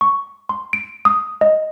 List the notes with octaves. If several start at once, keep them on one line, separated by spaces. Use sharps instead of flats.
C#6
C6
D7
D#6
D#5